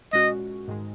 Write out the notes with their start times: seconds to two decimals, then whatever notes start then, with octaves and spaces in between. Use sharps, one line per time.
0.13 A#2 G#3 C#4 F#4 D#5
0.68 G#2 D#3 G#3